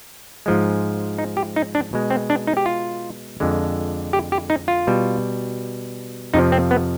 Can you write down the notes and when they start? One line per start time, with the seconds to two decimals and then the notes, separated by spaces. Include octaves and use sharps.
0.46 G#2 F3 G#3
1.18 D#4
1.37 G4
1.56 D#4
1.75 D4
1.93 B2 G#3
2.10 C4
2.30 D4
2.47 D#4
2.57 G4
2.66 F4
3.40 F2 D3 G#3
4.13 G4
4.32 G4
4.50 D#4
4.68 F4
4.87 B2 G3
6.34 F2 C3 F3 D#4
6.52 C4
6.71 B3